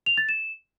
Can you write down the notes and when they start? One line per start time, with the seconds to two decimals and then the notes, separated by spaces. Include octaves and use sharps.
0.06 F7
0.18 A6
0.29 E7